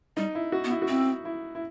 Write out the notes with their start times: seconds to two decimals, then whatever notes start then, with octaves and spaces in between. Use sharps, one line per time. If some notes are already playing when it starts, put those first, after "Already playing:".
0.17 G3 D#4
0.35 E4
0.52 F#4
0.65 B3
0.70 E4
0.82 F#4
0.88 C4 E4
1.25 E4
1.55 E4